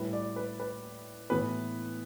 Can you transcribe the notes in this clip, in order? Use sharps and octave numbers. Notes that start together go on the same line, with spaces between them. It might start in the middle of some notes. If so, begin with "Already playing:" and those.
Already playing: A2 G3 E4 B4
D5
B4
B4
A2 E3 B3 B4